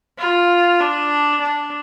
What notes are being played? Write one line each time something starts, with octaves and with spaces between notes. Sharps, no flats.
F4
D4
D4